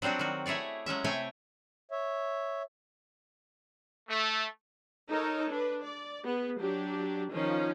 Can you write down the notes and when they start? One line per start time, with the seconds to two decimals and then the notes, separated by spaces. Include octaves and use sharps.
0.02 F#3 G3 C4 D4 F#4
0.19 D#3 F#4
0.46 A3 E4 G#4 C#5 D5
0.86 F#3 G#3 C#4 E5
1.04 C3 A3 E4 C#5 G5 G#5
1.91 C#5 E5
4.09 A3
5.09 D#4 A4 A#4 C#5
5.50 D4 B4
5.82 D5
6.24 B3 G#4
6.59 F#3 D4 G4
7.30 D#3 F3 C#4 D#4